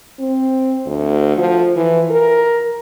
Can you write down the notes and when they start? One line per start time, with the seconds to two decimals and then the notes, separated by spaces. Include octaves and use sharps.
0.20 C4
0.86 D2
1.37 F3
1.76 E3
2.10 A#4